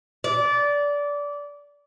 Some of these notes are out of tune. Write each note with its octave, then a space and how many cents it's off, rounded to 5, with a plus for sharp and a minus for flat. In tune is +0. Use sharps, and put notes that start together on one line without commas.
D5 -20